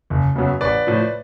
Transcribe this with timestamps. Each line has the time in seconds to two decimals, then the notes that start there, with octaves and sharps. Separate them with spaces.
0.10 F#1
0.35 F#2 C#3 F#3 B3
0.61 A1 B4 D5
0.87 A2 F3